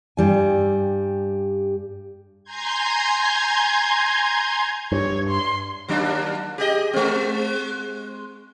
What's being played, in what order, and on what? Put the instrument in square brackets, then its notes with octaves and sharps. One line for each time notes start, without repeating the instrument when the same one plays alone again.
[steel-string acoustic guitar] G2 G3 G#5
[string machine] G#5 A#5 C6 G6 G#6
[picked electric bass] G2 [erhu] C#5
[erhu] C6
[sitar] D#2 F#3 D4
G4 G#4 D#5
G#3 C4